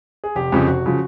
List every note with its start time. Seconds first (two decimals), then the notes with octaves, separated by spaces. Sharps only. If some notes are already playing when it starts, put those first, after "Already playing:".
0.24 G#4
0.35 F1 G4
0.52 F2 C#3 F3
0.68 F1 F#4
0.86 C#3 F3